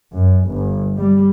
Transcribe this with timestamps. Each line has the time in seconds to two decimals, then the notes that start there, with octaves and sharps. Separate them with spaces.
0.14 F#2
0.48 G1
0.97 G3